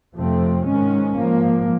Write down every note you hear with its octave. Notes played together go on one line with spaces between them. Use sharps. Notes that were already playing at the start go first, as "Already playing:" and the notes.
F2 C3 F3 A3 C4
G#2 D#3 G#3 C#4
G#2 F3 A#3